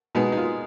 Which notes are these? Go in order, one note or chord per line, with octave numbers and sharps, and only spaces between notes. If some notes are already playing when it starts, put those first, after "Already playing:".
B2 G#3 B3 D#4
D#4
F4